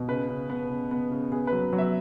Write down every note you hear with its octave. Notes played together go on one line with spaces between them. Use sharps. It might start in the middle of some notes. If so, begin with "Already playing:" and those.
Already playing: B2
C#3 B4
C#3
B3
C#3
B3
C#3
B3 G#4
B4
F#3
F#3
E5